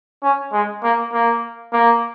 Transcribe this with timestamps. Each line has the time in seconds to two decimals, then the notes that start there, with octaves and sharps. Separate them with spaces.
0.23 C#4
0.53 G#3
0.83 A#3
1.13 A#3
1.73 A#3